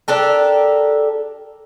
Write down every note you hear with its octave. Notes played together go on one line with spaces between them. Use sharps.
D4 G4 A4 A#4